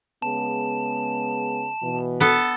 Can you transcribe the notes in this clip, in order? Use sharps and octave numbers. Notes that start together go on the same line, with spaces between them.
C#3 G#3 B3 A5
B2 E3
B3 A4